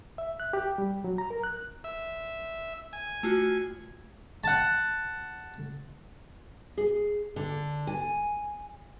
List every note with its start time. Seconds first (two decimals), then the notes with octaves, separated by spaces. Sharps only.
0.18 E5
0.40 F#6
0.53 G4
0.78 G3
1.04 F#3
1.18 A#5
1.30 A#4
1.44 F#6
1.84 E5
2.93 G#5
3.23 A3 F4 F#4
4.44 F#5 A5
6.78 G#4
7.36 D3
7.87 G#5